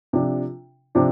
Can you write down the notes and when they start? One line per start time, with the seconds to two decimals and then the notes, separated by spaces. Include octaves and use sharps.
0.13 C3 F3 D4
0.95 C3 F3 D4